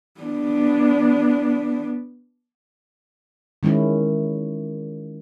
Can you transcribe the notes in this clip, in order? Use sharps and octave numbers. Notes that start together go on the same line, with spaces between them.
B3 D4
D#3 G#3 C#4 E4